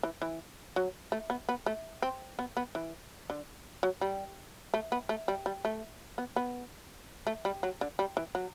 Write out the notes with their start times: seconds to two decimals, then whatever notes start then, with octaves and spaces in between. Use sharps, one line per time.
0.03 E3
0.22 E3
0.76 F#3
1.12 A3
1.30 B3
1.49 B3
1.66 A3
2.02 C4
2.39 B3
2.57 B3
2.75 E3
3.30 D3
3.83 F#3
4.01 G3
4.74 A3
4.92 B3
5.09 A3
5.28 G3
5.46 G3
5.65 A3
6.18 B3
6.36 B3
7.27 A3
7.45 G3
7.63 F#3
7.81 D3
7.99 G3
8.17 E3
8.35 F#3